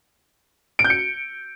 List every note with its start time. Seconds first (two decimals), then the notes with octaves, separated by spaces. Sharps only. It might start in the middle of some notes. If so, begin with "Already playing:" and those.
0.79 D7
0.84 G6
0.90 C#7